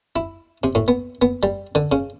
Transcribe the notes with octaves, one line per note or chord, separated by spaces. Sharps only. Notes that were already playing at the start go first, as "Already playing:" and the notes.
E4
C3
A2
B3
B3
G3
D3
C#3